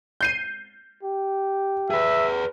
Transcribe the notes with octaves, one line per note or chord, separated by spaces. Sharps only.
G6 C7 D#7
G4
G#4 B4 E5